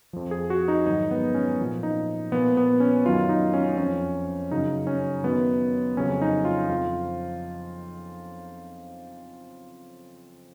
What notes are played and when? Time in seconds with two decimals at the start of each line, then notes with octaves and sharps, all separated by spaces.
0.13 F2 F3
0.31 G#4
0.50 F#4
0.68 D#4
0.86 G#2 D#3 F#3 D#4
1.11 B3
1.35 C#4
1.59 A#2 F3
1.83 D#4
2.32 A#2 F3 B3
2.57 B3
2.80 C#4
3.05 F#2 D#3 F#3 F4
3.29 D#4
3.53 C#4
3.78 F2 F3 C#4
4.51 F#2 C#3 F#3 D#4
4.87 C#4
5.23 F#2 D#3 F#3 B3
5.97 F2 C#3 F#3 C#4
6.21 D#4
6.45 F4
6.69 F2 F3 F4